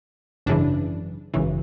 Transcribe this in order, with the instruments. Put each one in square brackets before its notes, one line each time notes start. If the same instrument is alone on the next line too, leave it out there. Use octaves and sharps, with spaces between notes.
[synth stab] G#1 F#2 C#3 E3 D4
G#1 F#2 C#3 E3